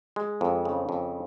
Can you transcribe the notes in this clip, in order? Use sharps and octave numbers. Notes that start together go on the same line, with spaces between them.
G#3
F2
C#3
F2